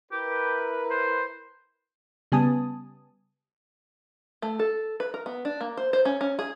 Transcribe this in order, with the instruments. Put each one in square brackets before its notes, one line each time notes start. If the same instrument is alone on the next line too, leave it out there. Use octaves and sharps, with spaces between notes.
[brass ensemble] E4 A#4 B4 [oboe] G4
[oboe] C5
[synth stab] C#3 G3 B3 G#5 A5 D#6
[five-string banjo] A3
A4
B4
A#4
B3
D4
A#3
C5
C5
C#4
C#4
G#4